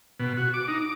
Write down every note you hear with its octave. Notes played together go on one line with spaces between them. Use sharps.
B2
F#4
D6
D#4
D6